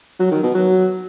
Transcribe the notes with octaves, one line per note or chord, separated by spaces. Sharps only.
F#3
D#3
B2
F#3